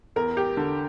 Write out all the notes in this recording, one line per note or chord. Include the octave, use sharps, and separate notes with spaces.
E2 A#4
G4
D3